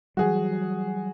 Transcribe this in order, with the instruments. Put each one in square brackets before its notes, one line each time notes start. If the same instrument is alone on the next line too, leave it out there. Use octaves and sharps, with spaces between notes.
[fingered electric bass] E3 F#3 G3 [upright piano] F#4 G#4